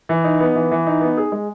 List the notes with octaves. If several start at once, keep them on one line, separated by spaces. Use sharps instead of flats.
E3
D#4
B3
E3
E3
D#4
B3
G#4
G#3